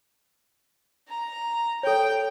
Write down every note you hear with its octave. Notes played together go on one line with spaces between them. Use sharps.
A#5
A4 C#5 G5